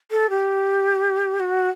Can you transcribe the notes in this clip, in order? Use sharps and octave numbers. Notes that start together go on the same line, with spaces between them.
A4
G4
F#4